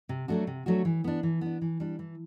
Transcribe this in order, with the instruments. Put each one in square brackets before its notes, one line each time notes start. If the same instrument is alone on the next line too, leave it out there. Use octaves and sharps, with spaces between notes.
[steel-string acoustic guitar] C3
F#3 A3 D4 F#4
C3
F#3 A3 D4 F#4
E3
B3 D4
E3
B3 D4
E3
G3 D4
E3